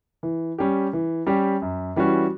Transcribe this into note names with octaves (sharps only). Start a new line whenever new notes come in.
E3
G3 C#4 G4
E3
G3 C#4 G4
F#2
E3 G3 C#4 F#4